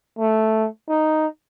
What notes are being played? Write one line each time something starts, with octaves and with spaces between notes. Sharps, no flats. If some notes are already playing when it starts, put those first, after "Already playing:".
A3
D#4